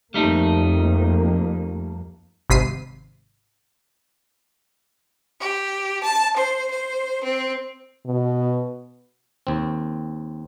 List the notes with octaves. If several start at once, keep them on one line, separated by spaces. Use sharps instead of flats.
F2 G3 A3 A#3 D#4
G#1 C3 B6 C7 D#7
G4
A5
C5
C5
C4
B2
D#2 C4